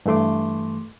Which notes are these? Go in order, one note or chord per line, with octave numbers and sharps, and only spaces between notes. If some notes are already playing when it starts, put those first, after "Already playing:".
G2 E3 A3 C6 D6